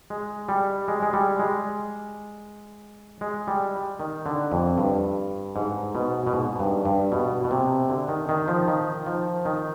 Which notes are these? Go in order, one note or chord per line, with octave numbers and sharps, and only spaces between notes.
G#3
G3
G#3
G#3
G3
G#3
G#3
G3
D#3
D3
F2
G2
G#2
B2
B2
G#2
G2
G2
B2
B2
C3
D3
D#3
D#3
F3
D#3
F3
D#3